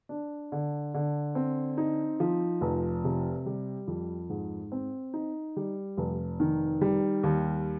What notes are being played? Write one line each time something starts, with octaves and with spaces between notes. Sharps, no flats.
D4
D3
D3
C4
D#4
F3
F1
C3
G3
F2
G#2
C4
D#4
G3
F1
D#3
G3
D#2